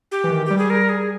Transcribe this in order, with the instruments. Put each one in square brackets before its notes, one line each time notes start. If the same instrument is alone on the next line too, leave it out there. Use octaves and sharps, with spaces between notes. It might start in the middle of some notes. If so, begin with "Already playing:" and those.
[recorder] G4
[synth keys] E3
D#3
[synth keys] G3 [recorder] G4
[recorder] G#4
A#4
G#4